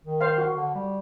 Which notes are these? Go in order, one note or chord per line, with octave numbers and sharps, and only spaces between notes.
D#3
C5 F5
F#4
D3
G3